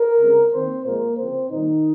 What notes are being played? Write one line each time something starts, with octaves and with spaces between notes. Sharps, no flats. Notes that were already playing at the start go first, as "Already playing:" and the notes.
Already playing: A#4
C#3 G#3 C4
D#3 A#3 C4 C5
A#2 F3 G#3 A#3 A#4
C#3 F3 A#3 C4 C5
A#2 D#3 G3 A#3 D#4